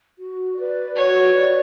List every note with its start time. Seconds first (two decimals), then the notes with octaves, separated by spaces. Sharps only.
0.18 F#4
0.56 B4 D5
0.95 F#4 C#5
1.33 B4 D5